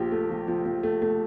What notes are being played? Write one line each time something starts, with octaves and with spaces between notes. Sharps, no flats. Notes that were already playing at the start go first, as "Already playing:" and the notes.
Already playing: A#1 F3 G4
A3
F3
F3
F3
A3
A3